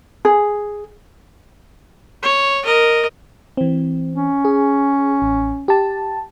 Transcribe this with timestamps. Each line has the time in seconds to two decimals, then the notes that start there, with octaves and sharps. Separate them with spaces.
0.25 G#4
2.23 C#5
2.63 A#4 D#5
3.57 E3 C4
4.14 C#4
4.45 G#4
5.22 A1
5.68 G4 A5